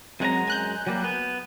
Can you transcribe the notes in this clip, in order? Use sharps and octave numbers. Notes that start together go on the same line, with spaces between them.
F#2 F#3 G#3 C4 F#5 A#5
G#5 F#6 G6
F#3 G3 A#3
B3